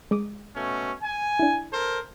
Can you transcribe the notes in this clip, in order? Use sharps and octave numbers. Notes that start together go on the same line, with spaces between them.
G#3 D6 D#6
B2 A3 C#4
G#5
D4 E4
A4 A#4 C5